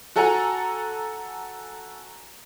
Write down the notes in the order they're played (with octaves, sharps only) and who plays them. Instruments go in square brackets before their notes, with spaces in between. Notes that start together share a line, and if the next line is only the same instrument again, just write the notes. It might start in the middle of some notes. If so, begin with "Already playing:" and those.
[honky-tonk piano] F#4 A4 F#5 G#5 A#5